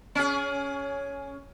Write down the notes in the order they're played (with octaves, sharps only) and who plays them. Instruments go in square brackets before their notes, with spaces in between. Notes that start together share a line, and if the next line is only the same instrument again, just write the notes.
[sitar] C#4 G#4